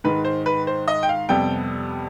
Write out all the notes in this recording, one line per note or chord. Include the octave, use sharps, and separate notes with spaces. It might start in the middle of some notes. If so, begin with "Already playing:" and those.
G#2 D#3 G#3 B4
C5
B4
C5
D#5
G5
F5
F2 C3 G3 B3 G5